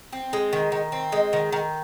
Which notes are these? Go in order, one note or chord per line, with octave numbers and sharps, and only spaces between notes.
C4
G#3
D#3
D#3
C4
G#3
D#3
D#3